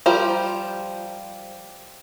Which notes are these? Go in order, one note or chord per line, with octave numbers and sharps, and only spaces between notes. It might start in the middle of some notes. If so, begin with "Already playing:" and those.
F3 G3 F4 A#4 C5